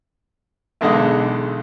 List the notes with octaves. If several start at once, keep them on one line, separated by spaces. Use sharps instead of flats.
B1 E2 D3 G#3 D#5 F#5